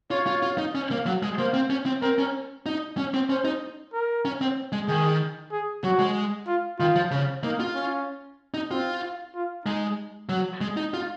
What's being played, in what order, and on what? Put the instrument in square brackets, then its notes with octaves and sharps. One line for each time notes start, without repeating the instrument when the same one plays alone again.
[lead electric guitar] F4 [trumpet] C#5
[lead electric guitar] F4
F4
D#4
C#4
A#3
F#3
G#3
[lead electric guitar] A#3 [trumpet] C5
[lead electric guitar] C4
C#4
C4
[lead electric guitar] C4 [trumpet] A#4
[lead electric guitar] C#4
D#4
C#4
C4
[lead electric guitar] C#4 [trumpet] C5
[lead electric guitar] D#4
[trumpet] A#4
[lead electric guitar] C#4
C4
G#3
[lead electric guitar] D#3 [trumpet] G#4
[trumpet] G#4
[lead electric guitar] F#3 [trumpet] F#4
[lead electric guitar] G#3
[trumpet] F4
[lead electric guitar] D#3 [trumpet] F4
[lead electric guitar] F3
C#3
[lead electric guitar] A#3 [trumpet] D#4
[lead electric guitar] F4
[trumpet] C#4
[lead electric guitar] D#4
[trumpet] C4 [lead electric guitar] F4
[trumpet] F4
[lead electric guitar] G#3 [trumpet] D#4
[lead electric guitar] F#3
G#3
D#4
F4